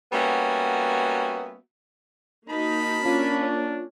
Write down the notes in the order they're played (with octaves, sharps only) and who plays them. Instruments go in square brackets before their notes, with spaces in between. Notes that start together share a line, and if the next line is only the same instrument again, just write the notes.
[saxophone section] G3 A#3 B3 C#4 F#4 E5
[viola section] A#3 D#4 F#4 [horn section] A#4 A5 B5
[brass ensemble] A#3 D4 [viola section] C#4 [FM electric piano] F4